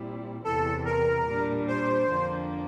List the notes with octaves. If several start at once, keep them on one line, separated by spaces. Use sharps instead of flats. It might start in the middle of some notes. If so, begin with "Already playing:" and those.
Already playing: A#2 G3 C4 E4
E2 C3 E3 A4
A#4
A#2 G3 D4
C5
F2 D3 F3 A#3 D4